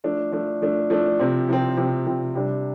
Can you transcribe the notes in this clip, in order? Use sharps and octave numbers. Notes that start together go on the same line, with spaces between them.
F3 A3 D4
F3 A3 D4
F3 A3 D4
F3 A3 D4
C3 F3 C4
C3 F3 C4
C3 F3 C4
C3 F3 C4
C3 G3 D4